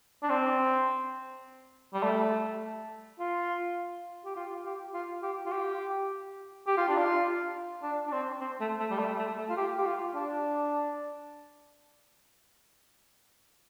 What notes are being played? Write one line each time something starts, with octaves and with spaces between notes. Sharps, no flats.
D4
C4
G3
A3
F4
G4
F4
G4
F4
G4
F4
G4
G4
F4
D4
F4
D4
D4
C4
C4
A3
A3
G3
A3
A3
A3
F4
G4
G4
F4
D4